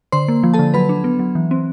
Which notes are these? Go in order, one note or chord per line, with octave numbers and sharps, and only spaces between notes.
D3 C5 C6
A#3
F3
A4 A5
D3
F#3 B4 B5
D4
B3
F#3
E3
C4